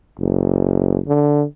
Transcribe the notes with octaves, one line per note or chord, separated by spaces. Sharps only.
F#1
D3